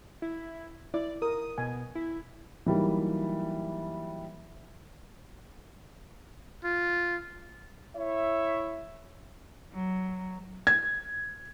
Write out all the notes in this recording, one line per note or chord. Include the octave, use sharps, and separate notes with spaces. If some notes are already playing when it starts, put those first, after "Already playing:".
E4
E4 D5
A#4 D#6
B2 G#5
E4
E3 F#3 G3 A#3 D#4
F4
E4 C#5 E5
F#3
G#6